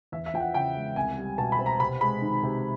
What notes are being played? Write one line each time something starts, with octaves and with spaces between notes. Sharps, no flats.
E2 E5
E5
F3 G5
F#5
C#3 G5
G#3
C2 G#5
G3
B2 A5
B5
C4
A#5
C3 B5
G#3 B5
D#3
C3